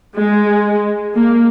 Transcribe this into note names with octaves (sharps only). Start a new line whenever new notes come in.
G#3
A#3